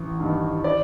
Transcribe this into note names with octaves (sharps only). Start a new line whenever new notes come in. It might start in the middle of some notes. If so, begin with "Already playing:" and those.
Already playing: A1
G2 D#3
D5